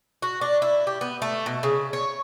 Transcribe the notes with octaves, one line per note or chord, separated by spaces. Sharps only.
F#4
D4
E4
G4
B3
A3
B2
C#3
C#5